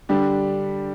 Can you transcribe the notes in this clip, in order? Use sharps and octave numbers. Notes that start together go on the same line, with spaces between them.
D3 G3 D4 G4